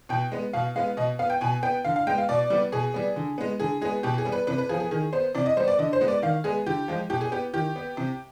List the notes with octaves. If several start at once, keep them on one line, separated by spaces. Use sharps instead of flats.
B2 G5
G#3 B3
B2 F5
G#3 B3 F5
B2 D#5
B3 F5
G5
B2 G#5
B3 G5
D3 F5
F5
G#3 B3 G5
F5
B2 D5
G3 B3
B2 G#4
G3 B3
D3
G#3 B3
D3 G#4
G#3 B3 G#4
B2 G4
G#4
G3 B3
B4
C3 B4
B4
F3 B3 G#4
G#4
D#3 G#4
B3 C5
C3 D5
D#5
G3 B3 C5
D5
D3 D#5
C5
G#3 B3
D5
D#3 F5
G#3 B3 G#4
D3 G4
F3 G#3
B2 G4
G#4
B3 G4
D#3 G4
B3
C3